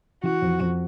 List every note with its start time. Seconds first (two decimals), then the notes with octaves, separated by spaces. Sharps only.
0.23 E3 F#4
0.42 F2
0.60 F2